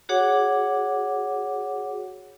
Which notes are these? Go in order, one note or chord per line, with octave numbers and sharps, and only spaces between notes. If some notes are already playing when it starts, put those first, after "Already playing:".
F#4 G#4 C#5 F#5 D6